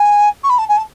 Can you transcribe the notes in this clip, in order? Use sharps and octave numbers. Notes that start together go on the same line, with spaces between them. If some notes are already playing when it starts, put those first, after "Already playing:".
Already playing: G#5
C#6
B5
A5
G#5
A5